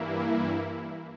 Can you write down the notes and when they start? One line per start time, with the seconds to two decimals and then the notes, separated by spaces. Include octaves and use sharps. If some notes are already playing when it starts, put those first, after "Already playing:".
Already playing: G2 E3 A#3 E4